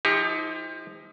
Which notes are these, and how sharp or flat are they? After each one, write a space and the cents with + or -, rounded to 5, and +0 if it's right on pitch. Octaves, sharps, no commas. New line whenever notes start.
F3 -10 D#4 +35 G4 +40